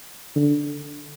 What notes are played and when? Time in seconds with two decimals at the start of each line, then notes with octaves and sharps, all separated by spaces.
0.36 D3